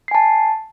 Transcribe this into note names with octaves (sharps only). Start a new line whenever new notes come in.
G#5 A5 C7